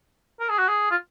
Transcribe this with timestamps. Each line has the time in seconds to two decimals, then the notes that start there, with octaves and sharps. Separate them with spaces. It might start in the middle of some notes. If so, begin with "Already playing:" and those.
0.40 A#4
0.49 G#4
0.58 F#4
0.69 G#4
0.91 F4